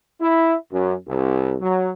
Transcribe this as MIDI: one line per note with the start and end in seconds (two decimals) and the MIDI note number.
0.20 0.56 64
0.71 0.93 42
1.07 1.54 36
1.60 1.91 54